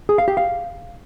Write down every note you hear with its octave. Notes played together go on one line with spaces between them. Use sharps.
G#4
F5
G4
F5